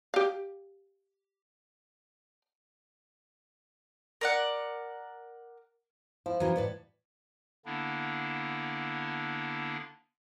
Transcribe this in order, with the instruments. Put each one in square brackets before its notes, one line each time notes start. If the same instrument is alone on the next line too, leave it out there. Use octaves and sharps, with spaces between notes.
[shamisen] G4 F5
[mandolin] A#4 D5 F#5
[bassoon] F3 [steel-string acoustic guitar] E4
[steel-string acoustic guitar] C#3 E3 F#3
A2 B4 D5
[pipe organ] D3 A#3 B3 D4 E4